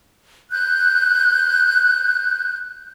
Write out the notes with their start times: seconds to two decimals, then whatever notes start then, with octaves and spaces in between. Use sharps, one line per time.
0.52 F#6 G6